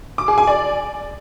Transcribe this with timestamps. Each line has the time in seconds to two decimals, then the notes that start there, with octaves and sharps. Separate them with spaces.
0.18 D6
0.28 G#4
0.38 G#5
0.47 D5